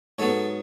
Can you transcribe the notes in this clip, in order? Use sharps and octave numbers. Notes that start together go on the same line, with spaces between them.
G#2 F#3 B3 A4 C#5